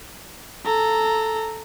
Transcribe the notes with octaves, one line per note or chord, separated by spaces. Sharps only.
A4 A#5